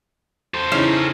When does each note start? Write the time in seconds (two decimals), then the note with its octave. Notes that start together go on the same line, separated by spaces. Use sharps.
0.54 A4 C5
0.72 C#3 E3 C#4 D#4 C7 E7